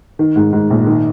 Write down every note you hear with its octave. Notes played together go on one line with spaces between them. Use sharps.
D#3
G#2
G#2
A#1
D#3